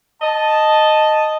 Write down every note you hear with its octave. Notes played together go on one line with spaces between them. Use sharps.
D#5 A5